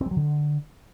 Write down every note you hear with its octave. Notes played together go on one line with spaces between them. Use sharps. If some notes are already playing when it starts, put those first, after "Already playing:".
C4
G3
F#3
D3